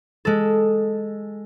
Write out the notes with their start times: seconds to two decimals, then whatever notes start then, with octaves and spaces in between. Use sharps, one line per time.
0.25 G#3 A4